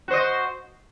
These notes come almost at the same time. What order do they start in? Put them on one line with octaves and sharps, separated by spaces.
F#4 C5 D#5